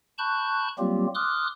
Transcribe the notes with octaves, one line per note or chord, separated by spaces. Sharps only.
A5 B5 C#6 F#6 G6
F#3 G3 A#3 C4 F4 G4
C6 D6 D#6 F6 F#6